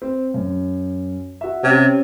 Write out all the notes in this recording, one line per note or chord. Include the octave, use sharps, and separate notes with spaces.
C4
F#2
F#4 E5
C3 C#4